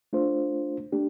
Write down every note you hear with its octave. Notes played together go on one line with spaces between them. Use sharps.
A3 D4 F4 C5
A3 D4 G4